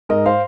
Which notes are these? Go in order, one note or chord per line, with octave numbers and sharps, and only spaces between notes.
G#2 A#4 D#5
C5 F5